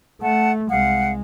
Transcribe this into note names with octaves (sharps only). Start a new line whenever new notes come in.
A3 F#5 A5
C2 G#3 F5 F#5